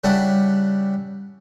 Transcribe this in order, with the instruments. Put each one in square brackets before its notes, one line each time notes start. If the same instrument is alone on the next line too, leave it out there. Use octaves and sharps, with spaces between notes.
[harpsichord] C#3 G3 D4 E4 F#5